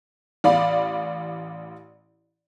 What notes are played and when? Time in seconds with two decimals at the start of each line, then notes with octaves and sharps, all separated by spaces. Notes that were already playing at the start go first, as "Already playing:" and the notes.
0.44 A1 D5 F5 B5